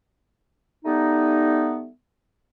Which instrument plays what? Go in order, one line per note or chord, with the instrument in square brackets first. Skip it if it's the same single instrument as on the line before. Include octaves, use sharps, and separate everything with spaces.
[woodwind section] G3 A3 B3 D#4